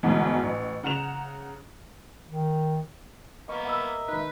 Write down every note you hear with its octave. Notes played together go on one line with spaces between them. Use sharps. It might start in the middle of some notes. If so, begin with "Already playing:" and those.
G#1 D2 G#2 B2 E3
A1
C#3 F#5 A#5 E7 F7
D#3
A#3 B3 D#5 C#6
A#4 D#5 E5 F#5 B5 E6
D#3 D#4 B4